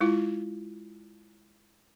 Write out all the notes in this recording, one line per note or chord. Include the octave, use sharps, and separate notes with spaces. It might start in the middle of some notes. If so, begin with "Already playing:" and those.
G#3 E4 F4